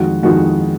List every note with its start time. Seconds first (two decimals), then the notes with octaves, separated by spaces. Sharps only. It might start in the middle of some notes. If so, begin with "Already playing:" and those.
Already playing: F2 D#3 G#3 F#4
0.23 F2 D#3 G#3 F#4